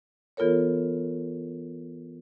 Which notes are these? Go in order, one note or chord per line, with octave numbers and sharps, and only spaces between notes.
E3 B3 F4 A4 A#4 C#5